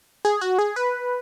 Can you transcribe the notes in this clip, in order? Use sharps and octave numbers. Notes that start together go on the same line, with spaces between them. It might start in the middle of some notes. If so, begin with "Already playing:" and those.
G#4
F#4
G#4
B4